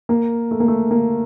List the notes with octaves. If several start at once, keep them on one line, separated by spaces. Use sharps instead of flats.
A#3
A3
A#3
A3
A#3